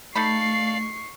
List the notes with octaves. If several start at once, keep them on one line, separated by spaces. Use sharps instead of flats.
A3 D#4 A4 D5 F5 B5 C#6 C7